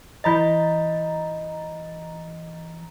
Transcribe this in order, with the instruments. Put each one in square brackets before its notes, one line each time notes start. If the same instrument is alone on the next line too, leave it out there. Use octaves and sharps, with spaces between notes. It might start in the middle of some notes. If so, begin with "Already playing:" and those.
[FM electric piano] E3 A#5 A6 [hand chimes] D#5 B5 G6